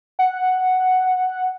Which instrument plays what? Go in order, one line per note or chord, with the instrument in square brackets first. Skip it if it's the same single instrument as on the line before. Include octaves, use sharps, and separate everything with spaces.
[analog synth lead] F#5